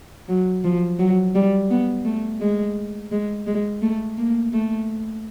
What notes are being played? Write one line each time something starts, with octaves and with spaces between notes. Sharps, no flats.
F#3
F3
F#3
G3
B3
A3
G#3
G#3
G#3
A3
A#3
A3